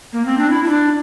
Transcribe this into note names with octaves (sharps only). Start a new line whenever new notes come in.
A#3
C4
D4
E4
E4
D4